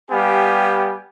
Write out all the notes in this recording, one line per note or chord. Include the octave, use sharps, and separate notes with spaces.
G3 B3 G4 F5 G#5